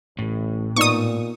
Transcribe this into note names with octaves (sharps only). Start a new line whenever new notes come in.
A1 A2
A#2 B3 D#4 D5 C#6 D#6